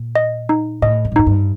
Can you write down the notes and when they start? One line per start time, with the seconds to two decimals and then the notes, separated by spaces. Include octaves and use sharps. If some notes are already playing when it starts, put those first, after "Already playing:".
Already playing: A#2
0.15 D#5
0.49 D#4
0.82 A2 D#5
1.05 G2
1.12 A2
1.16 G2 D#4
1.27 G2